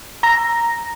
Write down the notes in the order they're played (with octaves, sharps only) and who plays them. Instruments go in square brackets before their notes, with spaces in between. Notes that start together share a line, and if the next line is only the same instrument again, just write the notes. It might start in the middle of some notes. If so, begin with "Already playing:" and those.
[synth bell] A#5 A#6